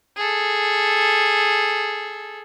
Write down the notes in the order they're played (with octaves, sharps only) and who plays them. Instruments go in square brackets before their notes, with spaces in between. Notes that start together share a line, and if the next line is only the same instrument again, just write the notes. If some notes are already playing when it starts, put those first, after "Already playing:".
[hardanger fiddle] G#4 A4